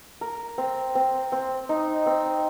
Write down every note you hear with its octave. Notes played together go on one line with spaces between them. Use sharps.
A#4
C4
C4
C4
D#4
C4